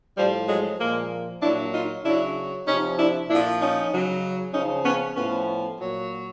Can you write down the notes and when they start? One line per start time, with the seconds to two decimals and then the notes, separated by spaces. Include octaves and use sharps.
0.17 A2 F3 G3
0.48 F#3 G#3
0.79 A#2 F3 G#3 A#3
1.42 A#2 F#3 D4 E4
1.73 D#4 F4
2.05 C#3 F#3 D4 E4
2.67 C3 F3 C#4 D#4
2.98 D4 E4
3.29 A#2 F3 D4 E4
3.60 C#4 D#4
3.92 C#3 F#3
4.54 C#3 F3 C#4 D#4
4.85 B3 C#4
5.16 A2 F3 B3 C#4
5.79 A#2 F#3